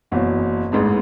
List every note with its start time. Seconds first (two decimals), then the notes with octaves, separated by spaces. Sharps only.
0.12 F#1 E2 B2 F#3
0.72 A1 G#2 G#3 B3